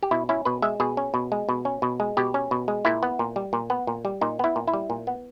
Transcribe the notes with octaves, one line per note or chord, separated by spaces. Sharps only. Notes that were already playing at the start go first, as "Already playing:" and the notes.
G4
B2 E4
C#4 E4
B2 B4
G#3 E5
B2 G#4
C#4
B2
G#3
B2
C#4
B2
G#3
B2 G4
C#4
B2
G#3
A#2 E4
B3
A#2
G3
A#2
B3
A#2
G3
A#2 D#4
B3 E4
A#2
E4
G3
A#2
B3